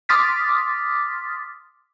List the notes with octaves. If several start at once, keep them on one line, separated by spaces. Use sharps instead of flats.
C6 D6 D#6 F6 A6 B6